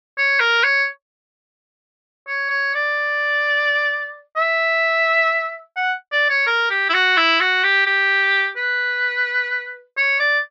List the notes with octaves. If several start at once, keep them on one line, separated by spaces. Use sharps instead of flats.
C#5
A#4
C#5
C#5
C#5
D5
E5
F#5
D5
C#5
A#4
G4
E4
F#4
E4
F#4
G4
G4
B4
C#5
D5